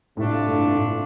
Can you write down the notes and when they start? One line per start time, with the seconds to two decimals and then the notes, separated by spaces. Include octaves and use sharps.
0.17 A2 C3 A3 D4 F4
0.46 G2
0.75 A2